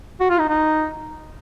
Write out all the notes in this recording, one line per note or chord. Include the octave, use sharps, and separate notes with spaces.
F#4
F4
D#4
D#4